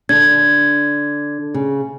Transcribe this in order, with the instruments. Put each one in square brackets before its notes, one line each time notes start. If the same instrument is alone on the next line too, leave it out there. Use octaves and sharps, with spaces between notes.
[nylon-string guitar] D3 D4 [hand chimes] G#6
[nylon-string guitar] C#3